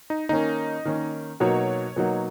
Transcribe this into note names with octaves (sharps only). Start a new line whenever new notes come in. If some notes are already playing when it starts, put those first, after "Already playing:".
D#4
D#3 A#3 C#4 D#4
D#3 A#3 C#4
B2 F#3 A#3 D#4 F#4 C#5
B2 F#3 A#3 D#4 F#4